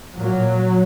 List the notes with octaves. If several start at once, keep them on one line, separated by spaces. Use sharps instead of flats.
A#2 F#3